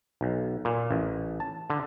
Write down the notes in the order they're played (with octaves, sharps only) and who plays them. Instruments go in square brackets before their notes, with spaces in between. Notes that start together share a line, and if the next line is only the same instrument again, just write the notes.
[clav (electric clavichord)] B1
A#2
A1
A5
D3